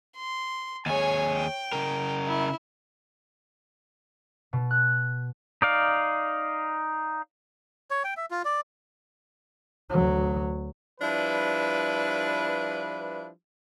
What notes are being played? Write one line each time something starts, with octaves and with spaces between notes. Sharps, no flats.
C6
D#2 G#4 C#5 G#5
G5
C#3 A#4
E4
B2
F#6
D#4 D5 F5
C#5
G5
E5
F4
D5
D2 F#3
F3 G3 D4 E4 B4